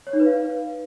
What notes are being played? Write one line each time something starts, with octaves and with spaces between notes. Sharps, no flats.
C#5
D#4
B4
F5